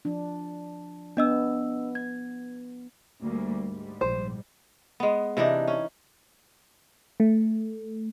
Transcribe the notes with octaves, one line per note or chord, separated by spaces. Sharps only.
F3 D4
B3 D4 D#5 E6
G#6
D2 G3 A#3
G#2 G3
A#1 C5
G#3 B3
C3 E3 D4 D#4
C#4
A3